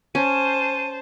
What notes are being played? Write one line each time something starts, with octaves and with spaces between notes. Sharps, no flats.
C#4 C5 A5 D#7